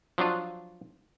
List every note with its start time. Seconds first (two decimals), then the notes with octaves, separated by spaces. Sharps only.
0.18 F3 F#3 D4 F4